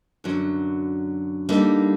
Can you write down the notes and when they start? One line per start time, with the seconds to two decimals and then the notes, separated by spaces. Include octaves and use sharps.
0.24 F#2 D3 F#3
1.49 D3 G3 A#3 D#4